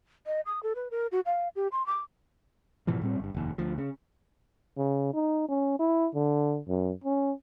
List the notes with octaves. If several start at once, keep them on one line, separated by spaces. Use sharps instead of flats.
D#5
D#6
A4
B4
A#4
F#4
F5
G4
C6
D6
G#2 B2 E3 F3
A2 G3 C4
G1 G2
F1 D#2
D2 F3
C#3
C#3
D#4
C#4
E4
D3
F#2
C#4